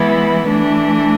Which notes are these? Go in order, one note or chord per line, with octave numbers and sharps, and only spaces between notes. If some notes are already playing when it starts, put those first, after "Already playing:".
Already playing: E3 G#3 B3 E4
E3 A3 D4